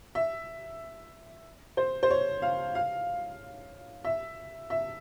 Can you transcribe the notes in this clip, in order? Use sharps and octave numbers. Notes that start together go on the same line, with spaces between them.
E5
C5
C5
C#5
F5
F5
E5
E5